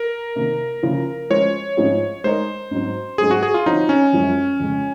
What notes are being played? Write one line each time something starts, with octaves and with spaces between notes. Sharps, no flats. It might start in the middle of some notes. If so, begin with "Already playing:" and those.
Already playing: A#4
C3 D#3 A#3
C#3 F3 A#3 F4
F3 G#3 C#4 G#4 C5 C#5
G#2 F3 C4 F4 G#4
G#3 D#4 A#4 C5 D#5
G#2 F#3 C4
G#2 F#3 C4 G#4
F#4
G#4
F4
F3 C4 D#4 F#4 C#5
C#4
F#2 F3 G#3
F2 C#3 G#3